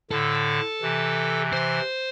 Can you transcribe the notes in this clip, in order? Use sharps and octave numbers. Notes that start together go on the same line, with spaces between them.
A2 D3 A4
C3 E3
C5